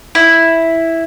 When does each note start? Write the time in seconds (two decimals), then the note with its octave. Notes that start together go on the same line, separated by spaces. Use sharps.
0.15 E4